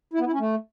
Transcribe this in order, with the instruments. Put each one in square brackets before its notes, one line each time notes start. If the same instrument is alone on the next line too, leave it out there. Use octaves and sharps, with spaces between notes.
[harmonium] E4
B3
E4
C#4
A3